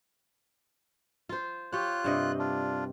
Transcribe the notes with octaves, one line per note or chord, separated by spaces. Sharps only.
F4 C5
F4 G4 C#5 F#6
G2 C3 D#5
D4 F4